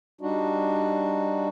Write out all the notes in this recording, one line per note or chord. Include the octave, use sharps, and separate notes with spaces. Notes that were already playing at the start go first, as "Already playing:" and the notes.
G3 D4 D#4 F#4